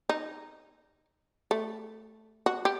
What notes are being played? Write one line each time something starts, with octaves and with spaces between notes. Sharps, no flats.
D#4
A3
F#4
G4